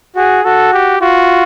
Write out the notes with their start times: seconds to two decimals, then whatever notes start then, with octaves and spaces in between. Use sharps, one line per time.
0.16 F#4 G#4
0.45 F#4 A4
0.73 G4
1.01 F4 F#4